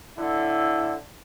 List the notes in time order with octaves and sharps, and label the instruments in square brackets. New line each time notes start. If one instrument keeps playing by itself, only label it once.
[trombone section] A2 D3 E4